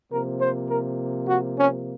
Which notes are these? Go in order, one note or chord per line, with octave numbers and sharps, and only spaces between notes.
C3 F3 A#3 A#4
C5
A#4
F#4
C#4